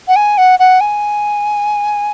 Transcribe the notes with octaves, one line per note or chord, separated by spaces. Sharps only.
F#5
G#5
F#5
F#5
G#5